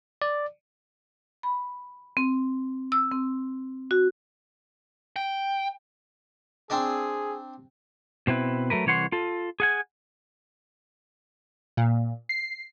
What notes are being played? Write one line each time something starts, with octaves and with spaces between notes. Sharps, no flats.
D5
B5
C4
E6
C4
F#4
G5
C4 D4 G#4 D5
B2 C4 E4 B4
F#3 A3 A#4 B4
C2 E3 C#5 F#5 C6
F4 A4
G#4 F#5 G#5
A#2
C7